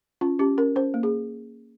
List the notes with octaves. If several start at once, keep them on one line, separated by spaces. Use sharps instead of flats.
C#4 F4
C#4 G4
C#4 A#4
C#4 C5
A#3
G#4